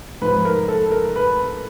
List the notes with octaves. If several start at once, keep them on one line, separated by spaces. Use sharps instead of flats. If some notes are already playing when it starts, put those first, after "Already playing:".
G#2 F3 B4
A#4
A4
A#4
B4